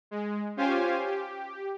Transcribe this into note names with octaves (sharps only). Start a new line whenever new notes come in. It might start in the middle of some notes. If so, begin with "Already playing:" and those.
G#3
C#4 F4 G4 C5 F5 G#5
G4